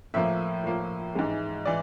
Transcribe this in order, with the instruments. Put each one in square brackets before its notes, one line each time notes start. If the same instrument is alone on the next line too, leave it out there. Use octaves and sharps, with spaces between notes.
[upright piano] A2 F3 A#3 E5
A2 F3 A#3
G#2 E3 G#3
E3 D5